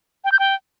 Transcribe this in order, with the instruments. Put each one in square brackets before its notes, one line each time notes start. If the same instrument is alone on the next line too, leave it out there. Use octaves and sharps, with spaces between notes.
[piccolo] G5
G6
G5